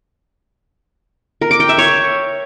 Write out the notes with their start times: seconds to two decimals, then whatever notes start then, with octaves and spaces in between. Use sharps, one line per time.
1.41 A#4
1.51 D6
1.60 G5
1.69 E5
1.78 C#5